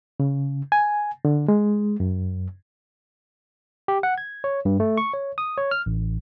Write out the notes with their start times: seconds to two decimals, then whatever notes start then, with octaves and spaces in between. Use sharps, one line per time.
0.20 C#3
0.72 G#5
1.25 D3
1.48 G#3
2.00 F#2
3.88 G4
4.03 F#5
4.18 G#6
4.44 C#5
4.65 G2
4.80 A3
4.98 C#6
5.13 C#5
5.38 D#6
5.58 C#5
5.71 F6
5.86 A1